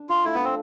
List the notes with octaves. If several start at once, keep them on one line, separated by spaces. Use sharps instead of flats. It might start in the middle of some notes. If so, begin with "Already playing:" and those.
Already playing: D4
F3 F4
A3 E4
B3 D4
C4